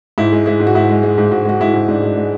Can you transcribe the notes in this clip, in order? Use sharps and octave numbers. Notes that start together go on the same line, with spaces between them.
G#2 E4
G#3
G#3 E4
G#2
F#4
G#2 E4
G#3
G#3
G#2
G#2 F#4
G#3 F#4
G#3 E4
G#2
G#2 D4
G#3 D4
G#3